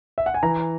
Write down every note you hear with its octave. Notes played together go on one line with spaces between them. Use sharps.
E5
F#5
G#5
E3 A#5